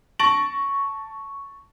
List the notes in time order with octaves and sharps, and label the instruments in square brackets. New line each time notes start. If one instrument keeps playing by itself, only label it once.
[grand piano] A5 C#6 A6 A#6 D7 F#7